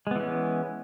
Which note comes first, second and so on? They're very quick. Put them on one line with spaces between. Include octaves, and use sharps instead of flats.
G#3 B3 E3 C#4